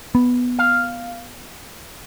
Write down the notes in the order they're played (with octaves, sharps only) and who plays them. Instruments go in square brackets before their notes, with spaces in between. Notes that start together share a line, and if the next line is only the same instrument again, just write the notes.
[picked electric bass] B3
[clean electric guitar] F5